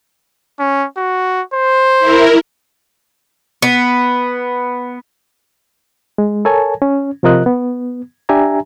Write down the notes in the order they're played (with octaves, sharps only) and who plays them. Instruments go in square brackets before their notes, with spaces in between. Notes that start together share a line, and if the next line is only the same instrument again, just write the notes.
[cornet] C#4
F#4
C5
[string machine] E4 A#4
[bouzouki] B3
[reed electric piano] G#3
A4 A#4 C#5 G#5 A5
C#4
C3 F3 F4 A#4 D#5 F#6
B3
D4 G4 E5 G#5 A#5